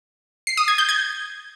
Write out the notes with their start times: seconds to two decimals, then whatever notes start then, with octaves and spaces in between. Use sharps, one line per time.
0.47 C7
0.57 D#6
0.68 G#6
0.78 G6
0.89 G#6